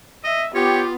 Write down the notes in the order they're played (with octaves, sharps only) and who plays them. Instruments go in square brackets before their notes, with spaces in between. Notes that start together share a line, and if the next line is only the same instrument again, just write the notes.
[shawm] D#5 [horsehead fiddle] E5
[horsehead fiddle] B3 [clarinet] F4 [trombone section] G4 [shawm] C#5